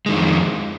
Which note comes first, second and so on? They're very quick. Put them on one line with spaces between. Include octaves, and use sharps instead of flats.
G#3 D#3 F2